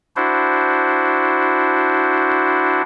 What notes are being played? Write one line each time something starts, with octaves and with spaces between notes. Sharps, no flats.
D4 E4 F#4 C5